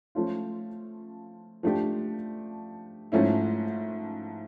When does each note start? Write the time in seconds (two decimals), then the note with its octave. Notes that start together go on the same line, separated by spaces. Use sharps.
0.15 F3 A3 C#4 F4
1.63 F3 A3 D4 G4
3.12 G#2 F3 A3 C#4 E4